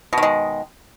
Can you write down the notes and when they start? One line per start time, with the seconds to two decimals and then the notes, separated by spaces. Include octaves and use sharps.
0.13 B2
0.18 D#3
0.23 G#3